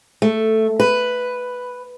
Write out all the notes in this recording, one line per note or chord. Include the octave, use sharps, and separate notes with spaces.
A3
B4